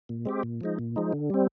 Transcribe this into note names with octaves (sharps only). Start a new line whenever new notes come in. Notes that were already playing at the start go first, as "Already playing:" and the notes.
A#2
G#3 C4 G4
A#2
F3 G#3 D#4
A#2
F3 G#3 D#4
D3
G3 C4